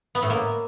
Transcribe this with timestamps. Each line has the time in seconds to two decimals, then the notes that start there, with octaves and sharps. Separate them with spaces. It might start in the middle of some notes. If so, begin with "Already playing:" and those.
0.15 B3
0.22 A2
0.30 A#3